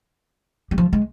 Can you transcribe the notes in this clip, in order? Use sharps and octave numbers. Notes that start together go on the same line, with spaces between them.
G3
F3
G#3